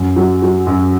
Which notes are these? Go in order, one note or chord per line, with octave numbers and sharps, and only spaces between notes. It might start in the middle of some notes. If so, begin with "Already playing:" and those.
Already playing: F#2
F#3
F#3
F#2